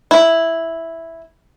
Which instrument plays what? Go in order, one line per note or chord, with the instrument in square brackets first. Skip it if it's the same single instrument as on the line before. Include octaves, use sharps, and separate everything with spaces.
[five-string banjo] E4